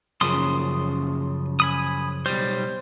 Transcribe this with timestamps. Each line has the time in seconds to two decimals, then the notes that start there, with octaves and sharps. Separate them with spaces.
0.21 F#2 C#3 F3 C6 D#6
1.60 G#5 B5 D#6
2.26 B1 G3 C5